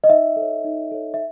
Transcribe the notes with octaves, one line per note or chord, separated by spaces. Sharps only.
D#5
D#4 E5
A4
C#5
D#4
A4 C#5
E5